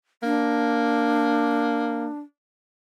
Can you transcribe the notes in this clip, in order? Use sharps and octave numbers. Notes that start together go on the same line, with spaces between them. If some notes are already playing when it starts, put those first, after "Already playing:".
A#3 D4